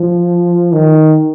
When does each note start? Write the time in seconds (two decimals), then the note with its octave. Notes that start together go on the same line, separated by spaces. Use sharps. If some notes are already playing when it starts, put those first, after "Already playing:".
Already playing: F3
0.72 D#3